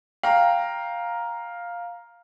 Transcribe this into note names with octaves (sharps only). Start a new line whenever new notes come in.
F5 G5 A#5